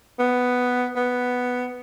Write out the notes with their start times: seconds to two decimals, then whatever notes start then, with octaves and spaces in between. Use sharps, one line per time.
0.19 B3
0.96 B3